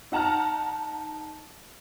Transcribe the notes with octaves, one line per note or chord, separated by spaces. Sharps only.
D#4 F#5 A5 A#5 F6